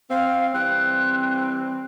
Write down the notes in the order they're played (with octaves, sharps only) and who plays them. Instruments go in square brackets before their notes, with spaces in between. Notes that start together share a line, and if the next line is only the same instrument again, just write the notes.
[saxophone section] C4 [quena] F5
[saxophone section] E3 G3 C4 [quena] F#6